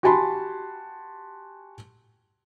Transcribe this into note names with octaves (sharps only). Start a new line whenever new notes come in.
F#4 G4 G#5 A5 B5 C6